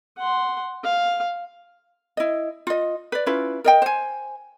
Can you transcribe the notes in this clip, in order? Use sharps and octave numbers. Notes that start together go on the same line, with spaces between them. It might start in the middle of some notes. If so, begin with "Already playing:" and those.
F#5 C6
F5
E4 D#5
F4 D#5
B4 D5
C#4 E4 F4 B4
A#4 D#5 G5
C5 G#5